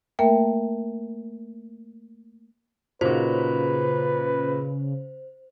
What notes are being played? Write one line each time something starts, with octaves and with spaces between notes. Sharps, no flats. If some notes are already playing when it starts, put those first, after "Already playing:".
A3 A#3 A#4 E5 G5
A#2 C#3 D#4 F#4 B4 C5